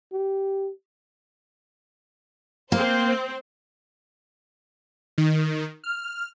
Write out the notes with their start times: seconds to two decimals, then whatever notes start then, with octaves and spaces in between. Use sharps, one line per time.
0.12 G4
2.72 A#3 C4 C5
5.18 D#3
5.84 F6